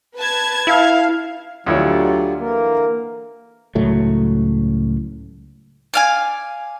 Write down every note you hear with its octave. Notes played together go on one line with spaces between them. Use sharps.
B4 A5 G#6
E4 F5
D2 D3 F#3 G3 E4 F4 C#5
D3 E3 A#3 A#4
C#2 A2 F#3 A3
D5 F5 G#5